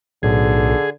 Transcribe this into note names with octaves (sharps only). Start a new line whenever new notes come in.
B1 A2 D3 G#4